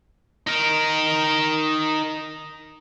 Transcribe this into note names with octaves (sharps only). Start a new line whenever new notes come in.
D#4 A#4